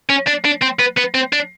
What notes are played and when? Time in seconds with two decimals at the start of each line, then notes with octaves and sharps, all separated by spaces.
0.10 C#4
0.27 D4
0.45 D4
0.62 C4
0.80 B3
0.98 B3
1.15 C4
1.33 D4